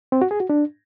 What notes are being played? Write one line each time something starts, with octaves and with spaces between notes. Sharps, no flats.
C4
F#4
G#4
F#4
D4